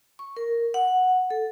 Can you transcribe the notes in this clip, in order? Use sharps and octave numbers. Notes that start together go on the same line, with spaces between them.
C#6
A#4
F#5
A4